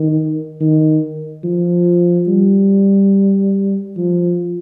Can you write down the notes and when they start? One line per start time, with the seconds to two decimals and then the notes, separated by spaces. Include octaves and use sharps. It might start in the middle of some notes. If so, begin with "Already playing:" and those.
Already playing: D#3
0.60 D#3
1.44 F3
2.28 G3
3.97 F3